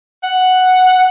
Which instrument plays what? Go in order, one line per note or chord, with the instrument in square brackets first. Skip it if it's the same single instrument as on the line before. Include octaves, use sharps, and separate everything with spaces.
[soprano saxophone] F#5